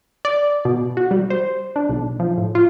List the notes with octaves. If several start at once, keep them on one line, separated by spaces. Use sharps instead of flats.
D5
B2
F#4
G3
C5
D4
B1
F3
A2
F4